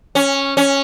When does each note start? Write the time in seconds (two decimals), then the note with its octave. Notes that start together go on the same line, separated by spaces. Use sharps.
0.15 C#4
0.57 C#4